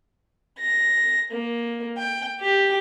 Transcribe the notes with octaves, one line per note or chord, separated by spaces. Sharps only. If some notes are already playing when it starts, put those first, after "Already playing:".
A#6
A#3
G5
G4